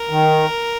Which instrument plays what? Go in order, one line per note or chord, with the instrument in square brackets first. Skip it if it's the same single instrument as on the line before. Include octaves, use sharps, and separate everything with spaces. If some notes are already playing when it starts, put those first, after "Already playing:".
Already playing: [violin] A#4
[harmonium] D#3